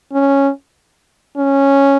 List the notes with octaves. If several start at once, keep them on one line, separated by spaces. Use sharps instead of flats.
C#4
C#4